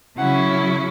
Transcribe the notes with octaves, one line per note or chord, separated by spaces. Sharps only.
C#3 F#3 C#4 E4 F#5